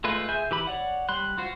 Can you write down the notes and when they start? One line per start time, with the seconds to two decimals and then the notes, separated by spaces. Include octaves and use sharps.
0.04 G#3 A3 F4 B4
0.29 G#4 E5 G#5 G6
0.51 E3 G4 B5
0.67 C#5 D5 F#5
1.09 G3 B5 C6 F#6
1.38 F4 F#4 C5